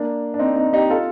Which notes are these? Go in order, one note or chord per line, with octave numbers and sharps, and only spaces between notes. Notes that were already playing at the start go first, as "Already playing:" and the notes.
Already playing: A#3 D4
D4
C4 D#4
C4 D#4
D#4 G4
F4 A4